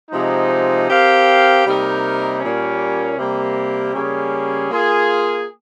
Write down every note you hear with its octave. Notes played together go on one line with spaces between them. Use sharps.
C3 F3 G#3 D#4
C4 G4 A#4 F5
C3 G3 A#3 D#4 A#4
A#2 G3 A#3 C#4
C3 G3 A#3
C#3 G3 A#3 C#4 G#4
A#3 F4 G#4